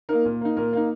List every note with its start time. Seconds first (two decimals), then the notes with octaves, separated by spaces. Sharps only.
0.09 A#3 D#4 A#4
0.25 A#2
0.41 A#3 D#4
0.57 A#2 A#4
0.73 A#3 D#4